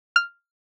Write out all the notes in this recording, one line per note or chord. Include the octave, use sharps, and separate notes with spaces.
F6